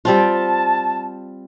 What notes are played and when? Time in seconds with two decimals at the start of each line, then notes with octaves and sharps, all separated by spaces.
0.05 G3 C4 F4 A5